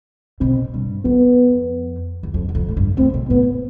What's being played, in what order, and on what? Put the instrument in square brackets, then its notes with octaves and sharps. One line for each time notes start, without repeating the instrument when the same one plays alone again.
[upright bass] B2 [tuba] C4
[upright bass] G2
[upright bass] F2 [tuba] B3
[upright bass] E2
F2
E2
F2
A2
G2
[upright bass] A2 [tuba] C4
[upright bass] B2
[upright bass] A2 [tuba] B3